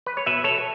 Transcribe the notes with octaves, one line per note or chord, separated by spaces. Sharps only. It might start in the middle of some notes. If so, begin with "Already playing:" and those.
B4
C#5
B2 B4 E5
A4 C#5